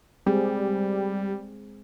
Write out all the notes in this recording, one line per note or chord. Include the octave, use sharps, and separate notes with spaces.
G3 G#3 C4 G#4